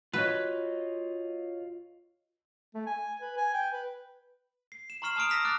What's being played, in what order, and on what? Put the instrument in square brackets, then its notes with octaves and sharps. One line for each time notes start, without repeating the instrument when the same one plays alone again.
[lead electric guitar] F4 D#5 [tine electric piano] F#4 C#5 [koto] B4
[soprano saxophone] A3
G#5
B4
G#5
G5
B4
[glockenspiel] C7
E7
A#5 C6 C#6 F6 C7 E7
A5 C#6 D#6 F6 D7 F7
D#6 E6 A#6 B6 F7
D6 F#6 A6 D7